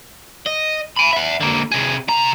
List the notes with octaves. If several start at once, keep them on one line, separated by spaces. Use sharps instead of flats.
D#5
G#5 B5
E5 F#5
D3 A#3
C3 G#4
C3 A#5